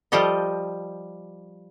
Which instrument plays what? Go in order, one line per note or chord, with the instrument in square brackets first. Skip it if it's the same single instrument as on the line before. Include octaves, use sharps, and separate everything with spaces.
[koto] F3 G3 F4 G4 A4 D#5